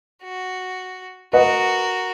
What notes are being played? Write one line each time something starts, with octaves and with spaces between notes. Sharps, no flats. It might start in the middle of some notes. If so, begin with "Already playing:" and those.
F#4
F#4 A#4 B4 D#5 F#5